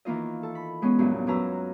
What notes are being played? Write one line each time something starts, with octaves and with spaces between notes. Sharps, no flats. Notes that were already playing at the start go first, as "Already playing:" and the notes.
D#3 E3 A#3 F4 D#5
A4
B5
G#3 B3 C#4
E2 G2 A#2 F#3
F#2 F#3 B4 A#5 E6